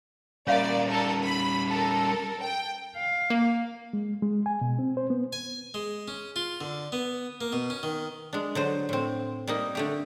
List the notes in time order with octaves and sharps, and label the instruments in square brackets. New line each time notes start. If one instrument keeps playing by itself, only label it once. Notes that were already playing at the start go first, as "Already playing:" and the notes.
[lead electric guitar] G3 C#4 [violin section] A#3 D5 [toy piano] C#5 E5 F5
[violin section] A4 A#4
B5
A4 A#4
G5
[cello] F5
[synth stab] A#3
[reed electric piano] G#3
G#3
G#5
B2
C4
C5
B3
[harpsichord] G#5
G#3
C#4
F4
D3
B3
A#3
B2
C#4
D#3
[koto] G#3 D4
D3 F#3 C5
A2 C4
G3 A#3 D#4
D3 A3 G4